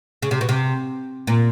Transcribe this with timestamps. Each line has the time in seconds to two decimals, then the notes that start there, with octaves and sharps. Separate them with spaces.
0.22 C#3
0.31 C3
0.41 B2
0.49 C3
1.27 A#2